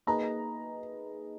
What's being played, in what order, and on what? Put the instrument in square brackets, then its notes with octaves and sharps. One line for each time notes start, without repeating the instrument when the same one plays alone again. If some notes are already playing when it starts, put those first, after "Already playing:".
[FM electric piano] A#3 D#4 G#4 B4 D#5 [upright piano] A#5